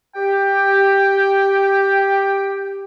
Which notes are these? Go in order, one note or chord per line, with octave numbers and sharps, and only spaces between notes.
G4 G5